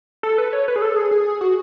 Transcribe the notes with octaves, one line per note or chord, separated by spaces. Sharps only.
A4
B4
C#5
B4
G#4
A4
G#4
G#4
F#4